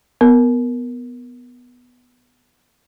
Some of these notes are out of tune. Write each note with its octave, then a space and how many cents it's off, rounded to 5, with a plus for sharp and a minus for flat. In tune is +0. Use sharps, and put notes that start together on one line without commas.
B3 +0 A#4 +0